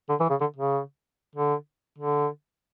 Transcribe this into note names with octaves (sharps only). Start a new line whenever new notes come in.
D3
E3
C#3
D3
C#3
D3
D3